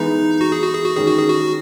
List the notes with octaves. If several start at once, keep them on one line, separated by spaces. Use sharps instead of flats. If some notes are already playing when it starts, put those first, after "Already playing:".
Already playing: E3 G#3 B3 D#4
F#4
G#4
F#4
G#4
F#4
D#3 G#3 C#4 G#4
F#4
G#4
F#4